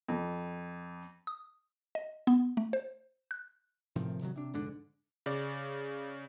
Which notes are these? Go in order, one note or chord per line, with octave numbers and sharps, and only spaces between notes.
F2
D#6
D#5
B3
A3
C5
F#6
A2 C3 D#3 F3
C3 D#3 F3 F#3
C3 D4
F1 G#2 D3 D4
C#3 D5